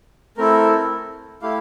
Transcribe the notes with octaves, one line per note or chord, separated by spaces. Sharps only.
A3 C4 E4 A4 A#4
A3 E4 G4 F5